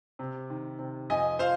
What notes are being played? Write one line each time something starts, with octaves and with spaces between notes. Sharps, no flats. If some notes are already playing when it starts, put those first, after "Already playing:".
C3
D#3
C3
F2 D#5 G#5
F3 C5 F5